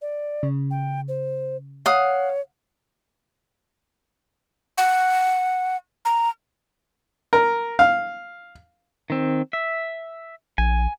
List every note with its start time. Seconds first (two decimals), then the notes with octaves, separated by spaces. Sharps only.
0.02 D5
0.43 C#3
0.71 G5
1.08 C5
1.86 C#5 F5 F#5 D#6
4.78 F#5
6.05 A#5
7.33 A#4
7.79 F5
9.10 D#3 C4
9.53 E5
10.58 A#1 G#5